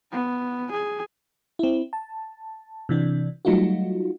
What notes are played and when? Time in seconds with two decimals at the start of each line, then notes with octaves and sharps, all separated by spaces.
0.12 B3
0.72 G#4
1.59 C4 E4
1.93 A5
2.89 C3 E3 D4
3.45 F#3 G3 A3 D#4 F4 F#4